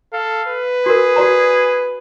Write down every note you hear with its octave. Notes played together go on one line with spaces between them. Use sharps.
A4 F5
B4
F#4 G#4 A#4
F#4 D5 A#5